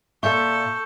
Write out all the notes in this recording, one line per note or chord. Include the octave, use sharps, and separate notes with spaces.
A#2 A4 E5 C#6 G6